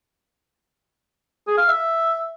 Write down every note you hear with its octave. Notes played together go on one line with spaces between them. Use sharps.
G#4
F5
E5